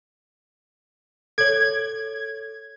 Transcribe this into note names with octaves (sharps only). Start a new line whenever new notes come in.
A4 C#5 G#6